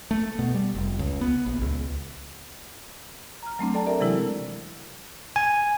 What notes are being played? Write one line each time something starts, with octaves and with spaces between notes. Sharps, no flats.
A3
B2
G3
F1
C#2
B3
A#1
C#2
A#5 F6
F#3 A3 C4 D4
A4 D5 G5 A5 A#5
G4 A#4 D5 E5
C3 E3 F#3 G#3 E4
G#5